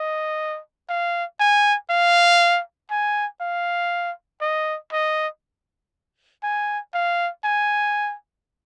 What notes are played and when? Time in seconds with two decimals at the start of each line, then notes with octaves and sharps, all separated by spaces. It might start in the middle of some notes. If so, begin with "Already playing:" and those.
Already playing: D#5
0.89 F5
1.40 G#5
1.90 F5
2.91 G#5
3.41 F5
4.41 D#5
4.93 D#5
6.44 G#5
6.94 F5
7.44 G#5